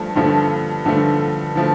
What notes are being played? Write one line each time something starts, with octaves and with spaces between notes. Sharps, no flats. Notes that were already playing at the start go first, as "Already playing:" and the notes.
Already playing: G2 F3 A3
G2 D3 F3 A3
G2 D3 F3 A3
D3 F3 A3